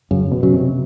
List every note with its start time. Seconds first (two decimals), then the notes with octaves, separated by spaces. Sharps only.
0.11 F#2 C#3
0.32 B2
0.43 C#3 F#3
0.53 C3